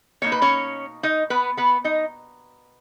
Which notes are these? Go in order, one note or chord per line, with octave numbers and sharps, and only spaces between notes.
B2 A#3 D#4 C#5
B4
C#4 C#5
D#4 D#5
B3 B4
B3 B4
D#4 D#5